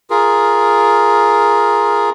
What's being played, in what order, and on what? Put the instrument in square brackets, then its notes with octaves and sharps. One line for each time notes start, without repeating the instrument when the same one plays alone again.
[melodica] F4 G#4 A#4